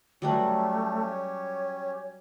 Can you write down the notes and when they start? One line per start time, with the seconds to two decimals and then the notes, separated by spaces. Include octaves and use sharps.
0.22 F#3 G3 A3 C#4 G4 B4
1.09 C#5